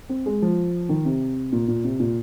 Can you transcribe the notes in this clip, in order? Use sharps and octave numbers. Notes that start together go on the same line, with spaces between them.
C4
G#3
F3
D#3
C3
A#2
A#2
C3
A#2